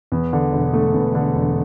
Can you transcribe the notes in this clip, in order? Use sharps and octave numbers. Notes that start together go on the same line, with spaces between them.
E2
D3
E1
A3
E2
D3
E1